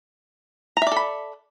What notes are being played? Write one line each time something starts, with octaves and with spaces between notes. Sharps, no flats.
A4 D5 E5 A#5 B5